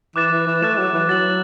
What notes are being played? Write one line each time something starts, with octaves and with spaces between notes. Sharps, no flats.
E3 D6 F#6 A6 E7
E3
E3
A3 F#6 A6 E7
F#3
E3
F#3 A6 F#7